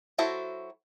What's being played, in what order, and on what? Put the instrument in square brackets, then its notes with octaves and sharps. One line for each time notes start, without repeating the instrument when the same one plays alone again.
[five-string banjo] F#3 E4 F#4 A4 C5